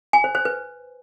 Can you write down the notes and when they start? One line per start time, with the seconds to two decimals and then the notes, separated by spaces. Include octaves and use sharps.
0.13 G#5
0.24 C5
0.35 C5
0.45 B4